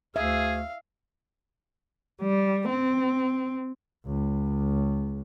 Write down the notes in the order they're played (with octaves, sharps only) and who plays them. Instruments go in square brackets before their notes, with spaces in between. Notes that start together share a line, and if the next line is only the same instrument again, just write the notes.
[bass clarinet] D2 [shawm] G#4 [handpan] E5 [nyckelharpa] F5
[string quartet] G3
C4
[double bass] C#2